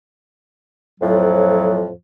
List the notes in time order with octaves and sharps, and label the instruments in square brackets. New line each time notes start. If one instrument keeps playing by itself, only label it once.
[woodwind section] F2 A2 F3 F#3